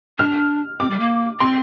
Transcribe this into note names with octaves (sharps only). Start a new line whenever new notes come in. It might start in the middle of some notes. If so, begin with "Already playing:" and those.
D4 F6
C4 D6
G3
A#3
C4 C6